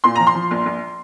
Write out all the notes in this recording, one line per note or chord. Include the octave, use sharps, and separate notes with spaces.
A#2 C6
F3 A#5
C6
F3
A#1
A#1